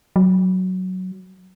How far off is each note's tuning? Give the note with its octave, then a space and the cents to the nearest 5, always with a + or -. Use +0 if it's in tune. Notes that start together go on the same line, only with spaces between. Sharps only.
F#3 +5